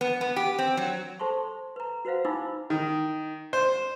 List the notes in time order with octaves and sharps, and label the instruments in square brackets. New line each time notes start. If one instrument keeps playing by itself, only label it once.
[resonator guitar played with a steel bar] B3
B3
G4
C4
F#3
[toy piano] A4 C5 A5 C6 C#6
B4 A#5
F#4 B4 C5 F5 F#5
D#4 E4 G#5 B5 D6 E6
[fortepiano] D#3
C5